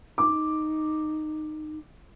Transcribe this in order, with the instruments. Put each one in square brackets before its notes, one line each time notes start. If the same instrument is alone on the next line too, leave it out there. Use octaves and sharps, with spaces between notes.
[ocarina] D#4 [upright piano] D6